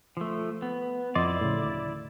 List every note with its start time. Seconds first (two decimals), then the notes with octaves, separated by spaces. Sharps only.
0.17 F3 A3
0.62 B3
1.15 F2 E4 D5 D#5 C6
1.41 A2 C#3
1.64 D2